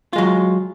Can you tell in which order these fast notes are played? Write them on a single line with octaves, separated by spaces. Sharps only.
F4 G#3 F#3